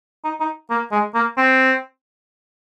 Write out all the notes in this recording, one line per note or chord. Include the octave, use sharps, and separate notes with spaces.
D#4
D#4
A#3
G#3
A#3
C4